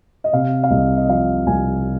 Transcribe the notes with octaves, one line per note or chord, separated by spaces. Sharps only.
D#5
C3 F5
F5
C2 D#5
D#5
F3 F5
C2 G#5